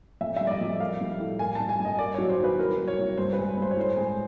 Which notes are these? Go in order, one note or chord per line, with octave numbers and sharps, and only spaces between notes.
F2 E5
E5
G3
D5
D#5
F2 D#5
A#3 F5
G3
A2
A#3 G#5
A5
G3
G#5
G2 D#5
A#3 D5
C#5
F#3
C5
D#2 B4
C2 A#4
F#3
C#5
C2
G2 C5
B4
G#3
G2 C5
C#5
A2 C5
G#3